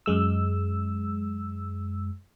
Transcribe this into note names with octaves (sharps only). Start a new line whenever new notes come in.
F#2 G#3 E6